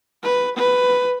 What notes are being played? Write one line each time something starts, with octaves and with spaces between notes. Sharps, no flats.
B4
B4